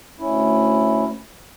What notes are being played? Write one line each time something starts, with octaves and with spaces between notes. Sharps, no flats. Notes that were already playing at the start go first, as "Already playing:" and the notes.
D2 C#4 E4